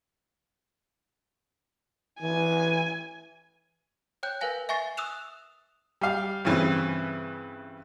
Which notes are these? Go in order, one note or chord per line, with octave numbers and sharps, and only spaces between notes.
E3 G#5
C#5 G5 F#6 G6
A#4 B4 F5 G#5 A#6
E5 G#5 C#6 A6 C7
D#6 E6 F#6 E7 F7
G3 F5
G2 C#3 E3 C4